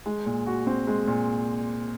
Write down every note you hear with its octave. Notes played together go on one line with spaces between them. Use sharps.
G#3
A#2
F#4
C4
G#3
A#2